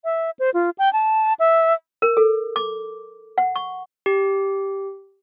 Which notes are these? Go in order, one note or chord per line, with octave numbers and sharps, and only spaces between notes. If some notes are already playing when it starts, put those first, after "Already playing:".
E5
C5
F4
G5
A5
E5
A#4
A4
D6
F#5
C#6
G4